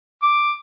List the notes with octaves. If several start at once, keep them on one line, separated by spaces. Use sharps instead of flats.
D6